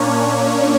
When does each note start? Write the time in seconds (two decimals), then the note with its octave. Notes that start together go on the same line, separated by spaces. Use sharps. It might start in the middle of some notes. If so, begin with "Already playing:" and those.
Already playing: A#2 A#3 C#4 D4 C#5
0.19 C#5